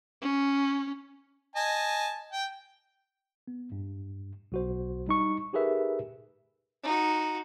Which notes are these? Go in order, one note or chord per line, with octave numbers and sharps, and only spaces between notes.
C#4
D#5 G#5 A5
G5
B3
G2
B1 F#4 C5
G3 D#4 C#6
D#4 G4 G#4 A#4 B4 E5
D#4 F#4